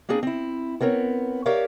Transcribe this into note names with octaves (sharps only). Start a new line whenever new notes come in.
A#3 C4 D4 G#4
C4 E4
B3 C4 A#4 C#5
G4 A#4 C#5 D5 E5 F5